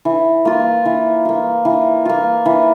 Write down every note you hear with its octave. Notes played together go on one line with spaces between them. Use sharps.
E3
A#3 F4
E3
A#3 F4
E3
A#3 F4
E3